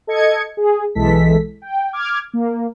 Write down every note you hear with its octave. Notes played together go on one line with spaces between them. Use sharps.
A4 D#5 G#6 C#7
G#4
B1 E3 G#3 A4 B6
G5
D6 F6 G#6
A#3